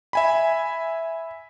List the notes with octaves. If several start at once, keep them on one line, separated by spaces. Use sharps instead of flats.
E5 G#5 B5